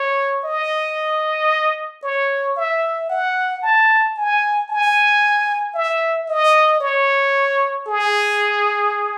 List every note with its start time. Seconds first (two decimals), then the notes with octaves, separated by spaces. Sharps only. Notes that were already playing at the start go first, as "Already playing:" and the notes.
Already playing: C#5
0.45 D#5
2.03 C#5
2.57 E5
3.10 F#5
3.63 A5
4.16 G#5
4.70 G#5
5.75 E5
6.28 D#5
6.81 C#5
7.87 G#4